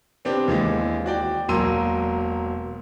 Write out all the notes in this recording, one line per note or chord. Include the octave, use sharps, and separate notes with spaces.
B3 C4 D4 G4
D#2 E3 G#3
F#4 D5 G5
E1 F#3 A#3 C6 E6 D#7